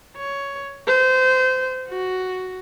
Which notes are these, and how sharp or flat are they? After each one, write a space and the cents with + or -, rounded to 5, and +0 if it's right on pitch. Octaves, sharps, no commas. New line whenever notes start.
C#5 +10
C5 -25
F#4 +5